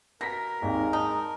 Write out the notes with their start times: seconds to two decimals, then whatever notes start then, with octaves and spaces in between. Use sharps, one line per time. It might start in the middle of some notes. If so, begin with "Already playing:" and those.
0.21 B2 A#4 A#6 B6
0.62 G#1 D#2 G#3
0.93 D#4 A5